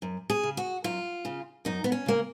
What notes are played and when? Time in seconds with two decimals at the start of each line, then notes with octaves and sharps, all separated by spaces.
0.02 F#2
0.30 G#4
0.43 C#3
0.57 F#4
0.84 F#2 F4
1.25 C#3
1.65 F#2 D#4
1.84 B3
1.92 C#4
2.06 C#3 A#3